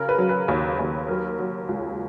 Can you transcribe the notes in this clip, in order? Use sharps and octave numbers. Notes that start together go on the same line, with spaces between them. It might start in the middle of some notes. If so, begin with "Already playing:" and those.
Already playing: C#3 F#3 A#4
B4
F#3
B4
D#2
D#2
F#3 A#4
F#3
C#2